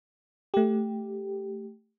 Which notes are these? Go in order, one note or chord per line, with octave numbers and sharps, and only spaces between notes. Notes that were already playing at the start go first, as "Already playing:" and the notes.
A3 G4